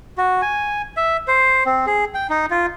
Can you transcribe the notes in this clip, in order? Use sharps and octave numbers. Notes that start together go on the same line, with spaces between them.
F#4
G#5
E5
C5
C4
G#4
G5
D#4
F4